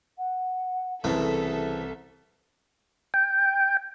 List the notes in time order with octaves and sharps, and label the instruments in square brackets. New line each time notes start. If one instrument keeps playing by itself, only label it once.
[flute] F#5
[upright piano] C2 [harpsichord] C#3 E3 C4 [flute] G#4 [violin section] A4 E5
[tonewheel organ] G5